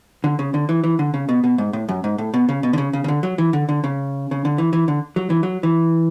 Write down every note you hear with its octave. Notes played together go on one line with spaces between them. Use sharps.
D3
C#3
D3
E3
E3
D3
C#3
B2
B2
G#2
A2
F#2
G#2
A2
B2
C#3
B2
D3
C#3
C#3
C#3
D3
F#3
E3
D3
D3
C#3
C#3
D3
E3
E3
D3
F#3
E3
F#3
E3